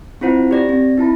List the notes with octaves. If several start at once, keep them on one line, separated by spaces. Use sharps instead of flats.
C4 E4 F4 C5 F#5
G4 D5 A#6
C4
D#4 E4 A5 B5